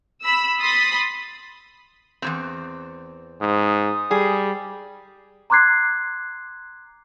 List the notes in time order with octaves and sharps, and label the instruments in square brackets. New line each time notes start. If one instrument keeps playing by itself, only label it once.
[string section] B5 E6
B5 C6 D#6 A6 B6
[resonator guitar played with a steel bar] E2 A#2 C4
[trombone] G#2 [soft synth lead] D#6
[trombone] G3 [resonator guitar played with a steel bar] G#4
[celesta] A#5 C6 D6 F#6 G#6 C7